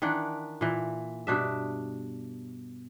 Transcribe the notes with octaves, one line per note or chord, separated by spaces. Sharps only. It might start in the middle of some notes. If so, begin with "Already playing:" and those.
D#3 E3 D4 F#5
A#2 E3
G2 B2 D4 E5